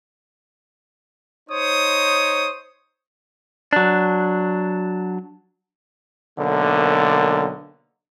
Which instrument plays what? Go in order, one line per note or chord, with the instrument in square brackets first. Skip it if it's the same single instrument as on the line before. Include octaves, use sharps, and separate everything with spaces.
[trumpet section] D#4 C5 C#5 D#6
[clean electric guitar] F#3 D4
[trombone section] B1 D3 A#3 A#4